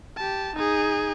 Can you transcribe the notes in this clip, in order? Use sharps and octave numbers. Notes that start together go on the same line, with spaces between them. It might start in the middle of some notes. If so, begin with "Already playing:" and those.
G4 A5
D#4 G#4